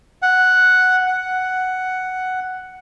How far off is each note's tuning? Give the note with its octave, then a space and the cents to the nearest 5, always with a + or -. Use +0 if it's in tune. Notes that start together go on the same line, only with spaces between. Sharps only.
F#5 +0
F#5 +5